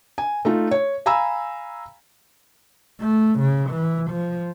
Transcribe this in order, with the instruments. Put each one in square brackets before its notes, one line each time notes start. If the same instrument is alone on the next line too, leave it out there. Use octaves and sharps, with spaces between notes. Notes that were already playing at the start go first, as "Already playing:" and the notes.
[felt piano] G#5
A3 D#4 F4
C#5
F5 G#5 A#5 B5 E6
[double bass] A3
C#3
E3
F3